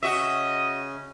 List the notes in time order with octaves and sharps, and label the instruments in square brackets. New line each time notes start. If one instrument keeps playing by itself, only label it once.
[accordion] C#3 C#4 [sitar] F#4 E5 [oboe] D#5